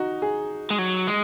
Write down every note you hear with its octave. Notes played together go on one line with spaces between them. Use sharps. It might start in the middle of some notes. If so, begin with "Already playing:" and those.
Already playing: D#4 F#4
G#4
G#3
F#3
G#3